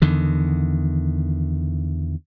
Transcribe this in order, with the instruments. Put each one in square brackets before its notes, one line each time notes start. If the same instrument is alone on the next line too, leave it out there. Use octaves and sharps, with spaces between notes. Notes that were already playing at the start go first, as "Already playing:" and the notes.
[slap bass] E2 D3 D#3